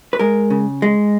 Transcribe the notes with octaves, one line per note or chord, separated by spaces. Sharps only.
B4
G#3 A#4
C#3
G#3